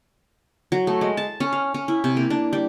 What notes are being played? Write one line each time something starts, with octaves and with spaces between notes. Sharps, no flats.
F#3
A3
G#3
A5
C#4
F5
C#4
E4
C3
A#3
D4
G3